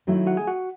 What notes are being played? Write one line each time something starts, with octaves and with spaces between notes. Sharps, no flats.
D#3 F#3 A3 E4
F#4 F#5
G#4 G#5
F#4 F#5